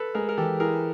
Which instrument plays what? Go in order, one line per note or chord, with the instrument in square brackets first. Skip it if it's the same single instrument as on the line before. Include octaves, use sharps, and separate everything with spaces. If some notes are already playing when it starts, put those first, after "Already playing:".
Already playing: [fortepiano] A4 B4
[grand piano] G#3 [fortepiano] G#4 A#4
[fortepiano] A#4
[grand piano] E3 [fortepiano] G4 A4
[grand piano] E4 [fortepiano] G#4 A#4